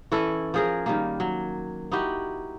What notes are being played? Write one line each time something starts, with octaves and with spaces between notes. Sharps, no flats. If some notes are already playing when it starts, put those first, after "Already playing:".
E3 C#4 E4 A4
F3 G#4 A#4
D#3 G3 A#3
F#3
D#4 E4 F#4 G4